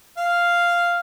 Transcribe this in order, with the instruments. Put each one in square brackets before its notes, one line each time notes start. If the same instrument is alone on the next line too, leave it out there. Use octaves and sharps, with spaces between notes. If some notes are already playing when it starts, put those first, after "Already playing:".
[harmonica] F5